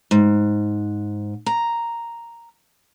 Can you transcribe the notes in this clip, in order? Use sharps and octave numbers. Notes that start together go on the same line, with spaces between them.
G#2
A#5